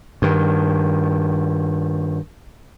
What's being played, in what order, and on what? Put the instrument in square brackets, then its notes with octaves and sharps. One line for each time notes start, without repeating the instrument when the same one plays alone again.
[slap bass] G2 D#3